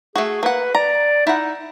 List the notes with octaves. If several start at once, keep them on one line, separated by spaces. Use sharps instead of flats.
A3 F#4 G#4
A#3 B4 F#5
D5 A#5
D#4 E4 F#5